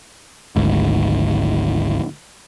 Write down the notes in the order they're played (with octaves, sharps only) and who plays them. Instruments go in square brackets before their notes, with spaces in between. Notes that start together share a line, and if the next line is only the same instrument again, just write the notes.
[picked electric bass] G#1 D2 G#2